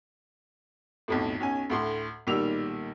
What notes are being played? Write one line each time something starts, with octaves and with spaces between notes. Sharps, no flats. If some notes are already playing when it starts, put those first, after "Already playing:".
B1 F2 A2
B1 C#4 G#5
D2 A2 C6
B1 A#2 D#3 G3 E6 F7